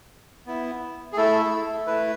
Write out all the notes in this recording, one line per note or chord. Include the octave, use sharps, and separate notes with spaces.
B3 E4
G#4
A3 E4 A4
A3 E4 B4